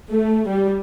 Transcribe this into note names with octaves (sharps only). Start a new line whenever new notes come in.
A3
G3